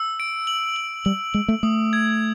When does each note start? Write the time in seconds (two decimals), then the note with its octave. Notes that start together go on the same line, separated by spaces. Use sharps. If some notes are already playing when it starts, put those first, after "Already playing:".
Already playing: E6
0.20 D7
0.47 F#7
0.76 F#7
1.05 G3 F#7
1.34 G#3 F#7
1.48 A3
1.63 A3 D#6
1.93 G#6